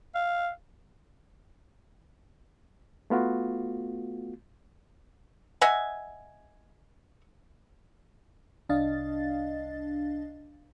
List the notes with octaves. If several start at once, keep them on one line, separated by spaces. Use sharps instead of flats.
F5
A3 B3 F4 F#4
D#5 E5 F#5 G#5
C2 D4 D#5 F5 A6